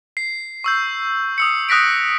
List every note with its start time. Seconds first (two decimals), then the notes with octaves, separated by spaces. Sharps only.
0.17 C7
0.64 C#6 E6 G6
1.38 D#6 E6 C#7
1.69 D#6 F#6 A#6 B6 D7